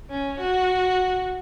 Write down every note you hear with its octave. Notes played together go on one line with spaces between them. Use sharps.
C#4
F#4